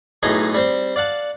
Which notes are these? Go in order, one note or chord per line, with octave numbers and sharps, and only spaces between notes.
B1 A2 D#4 G#4 D#6
G3 C4 C5
D5 F5 F#5 A5